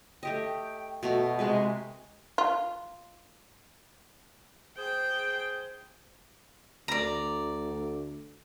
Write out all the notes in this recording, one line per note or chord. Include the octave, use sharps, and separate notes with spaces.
A3 G4 D#5 G5
B2 A3 F#4 A#5
C3 G#3 F#4 B4 G#5
F4
G#4 C5 G5
D2 D5 A#5